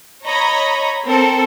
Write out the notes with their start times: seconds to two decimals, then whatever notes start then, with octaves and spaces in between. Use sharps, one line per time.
0.24 C#5 D#5 A#5 B5
1.05 C4 A4 A#4 C5